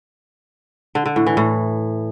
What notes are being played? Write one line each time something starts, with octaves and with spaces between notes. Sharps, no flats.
D3
D3
A2
E3
A2